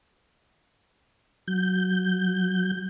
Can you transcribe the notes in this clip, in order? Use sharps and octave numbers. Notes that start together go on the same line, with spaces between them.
F#3 G6